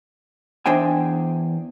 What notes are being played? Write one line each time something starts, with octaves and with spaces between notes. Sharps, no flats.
E2 D4 C5 G5 G#5